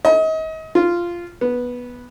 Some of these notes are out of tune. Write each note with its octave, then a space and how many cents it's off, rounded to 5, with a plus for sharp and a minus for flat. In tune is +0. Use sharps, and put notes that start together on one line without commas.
D#5 +35
F4 -10
B3 -10